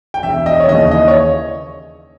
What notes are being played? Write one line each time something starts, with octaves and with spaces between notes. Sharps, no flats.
G5
E1 E5
D#5
C#5
D#2 C#3 E3 D#5
D#5
C#5